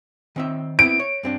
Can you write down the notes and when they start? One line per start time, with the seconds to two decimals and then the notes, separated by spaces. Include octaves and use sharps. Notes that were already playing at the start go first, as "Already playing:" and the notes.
0.36 D#3 C4 E5
0.79 B3 C4 E4 D7
1.00 C#5
1.23 G2 C4 D4